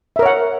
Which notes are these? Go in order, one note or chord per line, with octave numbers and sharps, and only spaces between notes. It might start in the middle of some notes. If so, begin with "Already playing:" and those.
A#4 C#5 E5 F#5